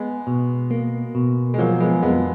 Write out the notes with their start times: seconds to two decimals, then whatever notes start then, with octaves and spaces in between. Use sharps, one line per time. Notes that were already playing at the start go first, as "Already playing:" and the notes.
Already playing: G#3 B3
0.27 B2
0.71 A#3
1.15 B2
1.54 G#3
1.58 F3 F#3 A#3
1.80 G#3 B3
2.03 F2 G#3 B3